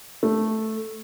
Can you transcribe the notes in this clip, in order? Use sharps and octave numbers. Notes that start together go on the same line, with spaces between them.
A3